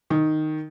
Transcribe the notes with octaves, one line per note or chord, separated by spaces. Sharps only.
D#3